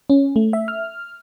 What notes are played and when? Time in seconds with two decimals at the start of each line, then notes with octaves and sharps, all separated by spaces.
0.10 C#4
0.36 A3
0.53 E5
0.68 F6